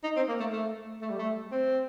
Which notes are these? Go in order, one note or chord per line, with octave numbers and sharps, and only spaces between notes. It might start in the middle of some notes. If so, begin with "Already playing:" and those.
D#4
C4
A#3
A3
A3
A3
G3
A3
C4